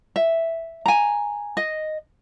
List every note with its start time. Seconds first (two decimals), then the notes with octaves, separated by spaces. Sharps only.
0.16 E5
0.86 G#5 A#5
1.57 D#5